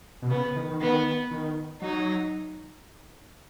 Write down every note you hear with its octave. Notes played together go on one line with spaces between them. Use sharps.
B2
C#3 B3
D#3
D#3
D#3 B3
D#3
F#3 D#4